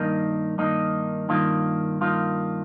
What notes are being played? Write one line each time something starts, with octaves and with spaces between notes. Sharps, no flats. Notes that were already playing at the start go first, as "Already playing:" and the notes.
Already playing: G2 D#3 A#3 D#4
G2 D#3 A#3 D#4
G2 D#3 A#3 F4
G2 D#3 A#3 F4